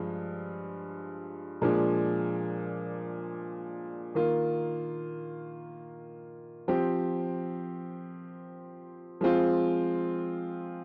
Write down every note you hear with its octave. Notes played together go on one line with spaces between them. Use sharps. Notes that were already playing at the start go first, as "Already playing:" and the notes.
Already playing: G2 F3 G#3
A#2 F3 G#3 D4
D#3 A#3 F4
F3 C4 G4
F3 G#3 C4 F4